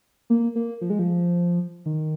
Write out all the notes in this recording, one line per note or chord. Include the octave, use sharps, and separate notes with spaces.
A#3
A#3
F3
G#3
F3
D#3